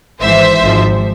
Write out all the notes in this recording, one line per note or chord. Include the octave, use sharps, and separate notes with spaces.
G#1 G#2 E3 C5 E5
G#1 G#2 F3